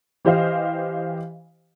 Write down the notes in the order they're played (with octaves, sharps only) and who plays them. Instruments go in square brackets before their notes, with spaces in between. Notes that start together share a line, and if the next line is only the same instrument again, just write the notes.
[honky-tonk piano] E3 G4 C5 D#5 F5